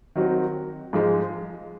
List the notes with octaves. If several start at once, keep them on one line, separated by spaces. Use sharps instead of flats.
D#3 F#3 C4 F#4
G#2 F3 G#3